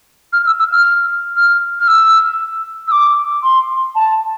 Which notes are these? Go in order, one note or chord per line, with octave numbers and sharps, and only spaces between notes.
F6
E6
E6
F6
F6
F6
E6
E6
D6
C6
A5